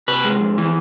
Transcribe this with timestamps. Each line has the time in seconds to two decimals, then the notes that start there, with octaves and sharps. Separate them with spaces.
0.08 C3 B4
0.25 G#3
0.40 F2
0.58 E3